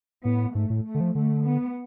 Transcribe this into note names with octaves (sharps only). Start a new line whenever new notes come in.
A2 B3
G#2 A3
A2
A3
D3
F3
D3 A3
B3